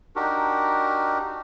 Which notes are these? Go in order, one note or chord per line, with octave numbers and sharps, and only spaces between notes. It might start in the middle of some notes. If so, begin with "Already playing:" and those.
D4 D#4 F#4 G4 A#4